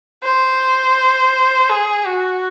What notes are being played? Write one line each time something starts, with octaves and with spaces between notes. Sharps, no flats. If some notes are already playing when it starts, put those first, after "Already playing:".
C5
G#4
F#4